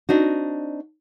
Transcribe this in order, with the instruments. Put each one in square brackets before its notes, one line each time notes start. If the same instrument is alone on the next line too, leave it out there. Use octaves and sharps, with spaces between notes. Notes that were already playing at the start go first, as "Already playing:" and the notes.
[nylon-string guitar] C4 D4 D#4 F#4